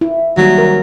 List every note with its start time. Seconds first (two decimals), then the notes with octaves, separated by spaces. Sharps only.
0.01 E4
0.37 D#3 F#3 G3 A#3
0.58 A#4